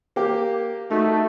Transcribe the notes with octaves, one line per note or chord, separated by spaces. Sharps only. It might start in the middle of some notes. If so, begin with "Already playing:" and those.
A#3 G4
A3 D#4 F#4